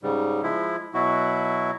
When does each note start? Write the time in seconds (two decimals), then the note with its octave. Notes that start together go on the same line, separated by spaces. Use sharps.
0.03 G#2 C#3 G3
0.43 F3 G#3 E4
0.94 B2 F#3 E4 F#4